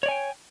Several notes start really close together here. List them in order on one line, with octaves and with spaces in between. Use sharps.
C#5 D5 G#5 G5